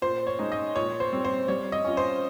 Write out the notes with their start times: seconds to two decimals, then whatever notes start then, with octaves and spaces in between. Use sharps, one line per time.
0.02 A#2 C5
0.27 C#5
0.39 G#3 D#4
0.52 D#5
0.75 A#2 C#5
1.00 C5
1.13 G3 C4
1.25 C5
1.48 G3 C#5
1.72 D#5
1.85 C#4 F4
1.97 C5